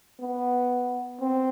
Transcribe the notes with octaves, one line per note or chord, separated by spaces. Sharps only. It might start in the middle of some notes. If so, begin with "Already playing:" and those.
B3
C4